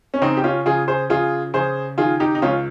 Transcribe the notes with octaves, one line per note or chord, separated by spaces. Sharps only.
C#4
C#3 C4 D#4
G4
C#4 F4
C#3 F4 G#4
G#4 C5
C#3 F4 G#4
C#3 G#4 C5
D#3 F4 G#4
D#4 G4
D#4
C#2 C#4 F4